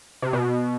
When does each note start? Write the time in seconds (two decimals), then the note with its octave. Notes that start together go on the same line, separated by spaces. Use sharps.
0.22 C3
0.33 B2